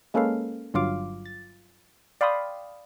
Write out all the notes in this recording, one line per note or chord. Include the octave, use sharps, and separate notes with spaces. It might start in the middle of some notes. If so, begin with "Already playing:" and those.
G#3 A#3 C#4 A4 B4 F5
G1 G2 F#3 F4 F5 D6
A6
D5 F5 G5 B5 C6 D#6